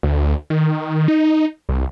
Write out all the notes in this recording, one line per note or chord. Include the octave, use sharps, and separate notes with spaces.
D2
D#3
D#4
C2